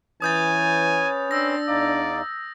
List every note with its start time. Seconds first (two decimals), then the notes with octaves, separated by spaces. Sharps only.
0.22 E3 C#4 B4 C#5 G#5 D#6 G6 A6
1.31 C4 D4 E6 A#6
1.68 E2 D#4 D5 F5